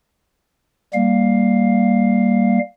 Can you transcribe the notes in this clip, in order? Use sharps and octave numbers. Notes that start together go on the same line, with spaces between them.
G3 A#3 F5